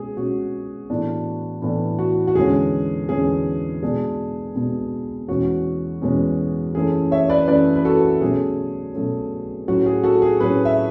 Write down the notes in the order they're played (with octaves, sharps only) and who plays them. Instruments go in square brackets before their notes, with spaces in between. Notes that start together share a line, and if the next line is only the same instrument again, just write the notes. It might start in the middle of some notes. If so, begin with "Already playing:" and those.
Already playing: [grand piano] B2 G#3 C#4 G#4
B2 G#3 C#4 F#4
A2 E3 B3 D4
A2 E3 B3 D4
F#4
F#4
E2 D3 G#3 C#4 G#4
E2 D3 G#3 C#4 G#4
B2 G#3 B3 D4 G#4
B2 G#3 B3 D4
E2 B2 G#3 C#4 F#4
E2 B2 G#3 C#4
F#2 E3 A3 C#4 G#4
C#5 E5
B4 D5
F#2 E3 A3 C#4 B4 D5
B4
F#4 A4
B2 F#3 A3 C#4 G#4
B2 F#3 A3 C#4
A2 F#3 C#4 F#4
G#4
F#4 A4
G#4
A2 F#3 C#4 G#4 B4
E5